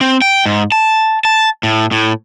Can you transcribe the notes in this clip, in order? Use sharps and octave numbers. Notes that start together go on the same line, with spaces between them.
C4
G5
G#2
A5
A5
A2
A2